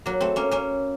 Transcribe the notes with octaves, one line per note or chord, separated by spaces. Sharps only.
F#3 A#3
A3 C4
A#3 C#4
A#3 C#4